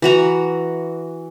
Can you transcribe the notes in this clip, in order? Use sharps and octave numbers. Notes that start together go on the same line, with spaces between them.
E3 F#4 A#5